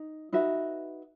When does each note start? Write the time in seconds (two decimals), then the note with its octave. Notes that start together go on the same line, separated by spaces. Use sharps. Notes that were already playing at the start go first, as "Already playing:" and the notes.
Already playing: D#4
0.33 D#4 F#4 B4 E5